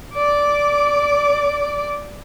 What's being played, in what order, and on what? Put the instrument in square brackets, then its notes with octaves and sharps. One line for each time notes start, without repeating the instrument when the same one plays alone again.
[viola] D5 D6